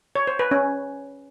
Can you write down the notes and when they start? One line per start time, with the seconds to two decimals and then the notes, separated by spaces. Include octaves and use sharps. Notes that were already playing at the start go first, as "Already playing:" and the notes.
0.15 C#5
0.27 C5
0.39 B4
0.51 C#4